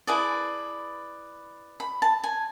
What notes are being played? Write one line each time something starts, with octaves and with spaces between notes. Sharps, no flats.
E4 G#4 B4 D5 A5
B5
A5
G#5